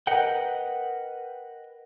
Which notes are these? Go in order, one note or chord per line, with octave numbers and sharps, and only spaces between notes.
A#4 B4 D#5 F#5 G5